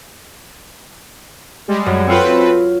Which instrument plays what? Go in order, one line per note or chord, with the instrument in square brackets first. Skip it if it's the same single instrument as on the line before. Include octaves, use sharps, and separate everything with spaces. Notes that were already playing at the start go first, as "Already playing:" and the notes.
[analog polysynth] G3 G#3
[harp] F#2
[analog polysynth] C4 A4 B4 [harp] F4 C#5